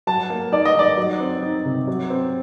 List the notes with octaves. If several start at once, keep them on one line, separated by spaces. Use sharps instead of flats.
F#3 A5
A#3
D#4 D5
D#5
D#3 D5
F#3
C4
D#4
C3
F#3
C4